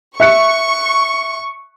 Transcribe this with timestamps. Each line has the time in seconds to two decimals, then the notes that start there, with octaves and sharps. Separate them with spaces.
0.20 E5 C#6 F#6 C#7